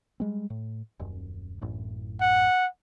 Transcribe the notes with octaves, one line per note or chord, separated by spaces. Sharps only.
G3 G#3 C4
A2
D#1 F#2
A1 F#2 A2
F#5